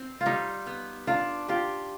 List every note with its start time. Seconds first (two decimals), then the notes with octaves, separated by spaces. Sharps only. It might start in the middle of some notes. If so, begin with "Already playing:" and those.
Already playing: C4
0.21 F4
0.26 G3 D#4
0.66 B3
1.07 D4 F4
1.48 F4 G4